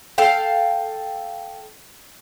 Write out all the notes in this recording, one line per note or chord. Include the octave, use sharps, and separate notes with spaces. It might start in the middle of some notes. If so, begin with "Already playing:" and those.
A4 F5 G5